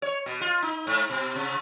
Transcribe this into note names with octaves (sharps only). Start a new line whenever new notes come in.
C#5
B2
F4
D#4
G#2
B2
C3